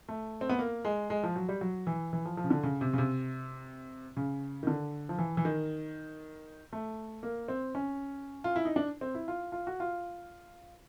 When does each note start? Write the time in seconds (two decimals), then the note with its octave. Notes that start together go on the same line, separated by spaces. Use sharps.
0.09 A3
0.41 C4
0.49 B3
0.59 A#3
0.85 G#3
1.10 G#3
1.23 F3
1.36 F#3
1.49 G3
1.61 F#3
1.87 E3
2.13 E3
2.25 F3
2.37 F3
2.44 C#3
2.50 D3
2.63 C#3
2.81 C3
2.93 C#3
2.98 C3
4.17 C#3
4.63 D#3
4.67 D3
5.09 F3
5.18 E3
5.37 E3
5.45 D#3
6.73 A3
7.23 A#3
7.48 C4
7.75 C#4
8.44 F4
8.56 E4
8.65 D#4
8.76 D4
9.01 C4
9.14 E4
9.28 F4
9.52 F4
9.67 F#4
9.80 F4